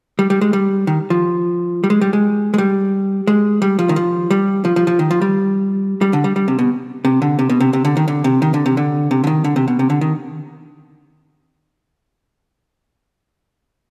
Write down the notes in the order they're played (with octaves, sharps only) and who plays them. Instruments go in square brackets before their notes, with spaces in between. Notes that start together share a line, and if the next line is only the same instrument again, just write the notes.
[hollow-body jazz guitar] G3
G3
G#3
G3
D#3
F3
G3
G#3
G3
G#3
G#3
G3
G#3
G3
F3
D#3
F3
G3
F3
F3
F3
D#3
F3
G3
G3
D3
G3
G3
C3
B2
C3
D3
C3
B2
C3
C3
D3
D#3
D3
C3
D#3
D3
C3
D3
C3
D3
D#3
D3
C3
B2
C3
D3
D#3